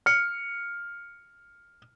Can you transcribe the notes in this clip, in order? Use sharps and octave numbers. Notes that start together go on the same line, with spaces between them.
F6 C#7